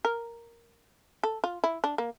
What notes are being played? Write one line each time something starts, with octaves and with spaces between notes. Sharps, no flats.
A#4
A4
F4
E4
D4
A#3